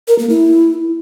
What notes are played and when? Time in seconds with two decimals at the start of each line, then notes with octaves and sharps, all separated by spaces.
0.08 A#4
0.19 A#3
0.30 E4